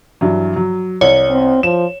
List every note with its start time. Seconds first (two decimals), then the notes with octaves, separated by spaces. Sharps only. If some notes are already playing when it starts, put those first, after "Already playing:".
0.21 G2 E3 F#3
0.56 F#3
1.01 C2 C#5
1.30 C4
1.63 F3 E7